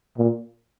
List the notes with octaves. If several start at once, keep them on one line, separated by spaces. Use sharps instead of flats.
A#2